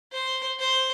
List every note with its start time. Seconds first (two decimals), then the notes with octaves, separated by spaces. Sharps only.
0.12 C5
0.59 C5